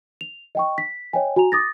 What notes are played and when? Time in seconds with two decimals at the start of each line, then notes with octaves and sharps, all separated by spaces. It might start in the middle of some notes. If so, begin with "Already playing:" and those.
0.21 F7
0.55 D#5 G5 C#6
0.78 B6
1.13 C#5 D#5 G5 G#5
1.36 F#4 G#5 A#5 F7
1.52 D6 D#6 A6 A#6